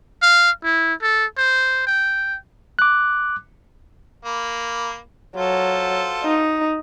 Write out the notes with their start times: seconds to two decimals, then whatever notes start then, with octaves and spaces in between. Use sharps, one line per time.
0.22 F5
0.64 E4
1.02 A4
1.38 C5
1.87 G5
2.79 D6 F#6
4.25 A#3 B5
5.37 F#3 F4 A4 C5
6.24 D#4